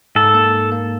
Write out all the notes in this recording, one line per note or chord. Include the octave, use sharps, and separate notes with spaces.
G#2 A4
A#3
G#2
A#3